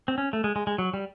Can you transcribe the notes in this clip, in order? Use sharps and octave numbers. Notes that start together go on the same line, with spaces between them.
C4
C#4
A3
G#3
G#3
G#3
F#3
G3